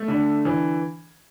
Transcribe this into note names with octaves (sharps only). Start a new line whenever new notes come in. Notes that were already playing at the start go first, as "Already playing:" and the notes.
Already playing: A3
D3
E3